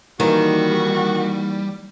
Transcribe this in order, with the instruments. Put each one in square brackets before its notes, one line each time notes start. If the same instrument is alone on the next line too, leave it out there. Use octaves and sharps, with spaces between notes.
[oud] D#3 [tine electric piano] E3 A#3 D#4 [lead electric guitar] G3 [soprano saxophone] F#4